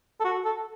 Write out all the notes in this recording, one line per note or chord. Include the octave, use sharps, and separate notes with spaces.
A4
F#4
A4